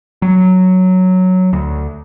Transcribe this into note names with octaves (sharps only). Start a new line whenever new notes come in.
F#3
D2